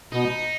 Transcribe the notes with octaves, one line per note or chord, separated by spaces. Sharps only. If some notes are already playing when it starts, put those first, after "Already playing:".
B2 D#4